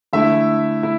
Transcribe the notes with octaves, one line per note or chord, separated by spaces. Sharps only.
D3 A3 E4 E5
E4